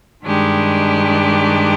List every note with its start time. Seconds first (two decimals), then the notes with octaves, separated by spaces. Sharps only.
0.24 G2 D#3 G#3 D4 G4